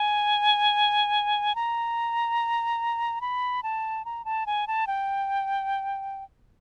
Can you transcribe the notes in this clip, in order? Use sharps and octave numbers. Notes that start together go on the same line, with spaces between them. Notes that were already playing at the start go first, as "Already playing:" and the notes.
Already playing: G#5
A#5
B5
A5
A#5
A5
G#5
A5
G5